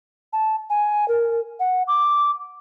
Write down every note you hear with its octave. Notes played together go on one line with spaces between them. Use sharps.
A5
G#5
A#4
F#5
D6